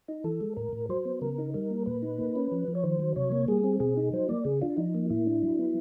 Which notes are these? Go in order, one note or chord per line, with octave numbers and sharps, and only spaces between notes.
D#4
E3 A4
G#3
A2 A#4
A2
F#3 C5
B3
C#3 A#4
D#4
G3 A#4
A#3
A#2 B4
D#4
A#3
C#4
F3
F3
C#5
D#3 C5
F#3
C3 C#5
A#3
G3 G#4
C4
B2 G#4
D#4
F#3 C5
A#3 D5
C#3 G#4
D4 F4
F3 D#4
A#3
A2 E4
D4
F#3
B3